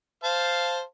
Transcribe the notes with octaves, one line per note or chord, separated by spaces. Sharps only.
C5 F5 A5